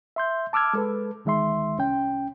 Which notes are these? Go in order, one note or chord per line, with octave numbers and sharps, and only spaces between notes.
E5 C6 G6
A5 D6 E6 F6 G#6
G#3 A4 B4
D2 D#3 G#3 E5 C6
C2 C#4 G5